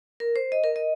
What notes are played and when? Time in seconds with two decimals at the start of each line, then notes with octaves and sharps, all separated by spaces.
0.20 A#4
0.36 C5
0.52 D#5
0.64 A#4
0.76 D#5